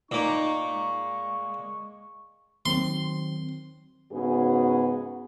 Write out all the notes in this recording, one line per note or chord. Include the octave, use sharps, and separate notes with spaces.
A#2 A#3 D#4 C#6
G#3
D#3 F#3 C4 C6
G#2 C#3 B3 F#4 G#4